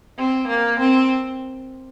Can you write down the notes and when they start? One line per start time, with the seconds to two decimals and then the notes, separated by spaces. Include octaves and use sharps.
0.18 C4
0.48 A#3
0.80 C4